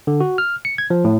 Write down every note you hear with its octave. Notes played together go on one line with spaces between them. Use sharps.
D3
F#4
F6
C#7
G#6
F3
A2